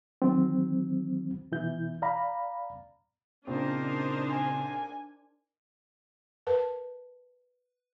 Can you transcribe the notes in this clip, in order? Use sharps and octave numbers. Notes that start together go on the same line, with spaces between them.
D#3 E3 F#3 C4
B2 E3 E4 G6
D5 F5 A#5 B5
A#2 C#3 C4 D4 D#4 A#4 C5
G#5
A#4 B4 A5